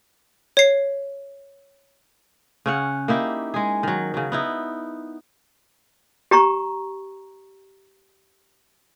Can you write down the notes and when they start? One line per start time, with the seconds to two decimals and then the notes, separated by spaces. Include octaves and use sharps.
0.57 C#5 C7
2.66 C#3 C#4 F#5
3.08 A#3 D#4 E4 G4
3.54 G#3 G#4
3.83 D#3 F#3
4.14 C#3 F#3
4.32 B3 D#4 E4
6.31 G4 A#5 C#6